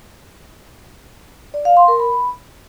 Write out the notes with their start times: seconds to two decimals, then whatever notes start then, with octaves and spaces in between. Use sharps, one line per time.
1.54 D5
1.65 F5
1.77 C6
1.88 A#4
2.00 B5